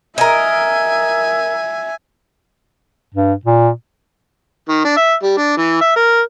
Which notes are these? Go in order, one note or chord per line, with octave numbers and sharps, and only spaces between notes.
A#4 D#5 E5 G#5
G2
A#2
D#3
D4
E5
G3
D4
E3
E5
A#4